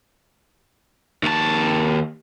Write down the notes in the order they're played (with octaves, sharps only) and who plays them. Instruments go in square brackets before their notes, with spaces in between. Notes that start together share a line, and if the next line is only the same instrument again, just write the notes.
[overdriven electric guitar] D#2 A5